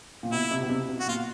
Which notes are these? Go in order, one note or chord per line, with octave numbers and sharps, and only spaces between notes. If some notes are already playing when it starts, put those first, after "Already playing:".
A#2
B2 E4
C3
B2
C3
B2
F#4
A#2 F4